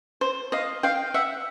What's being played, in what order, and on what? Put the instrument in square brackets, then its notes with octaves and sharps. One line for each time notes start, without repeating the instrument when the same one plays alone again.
[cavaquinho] C5
D#5 F5
F5 G5
E5 F#5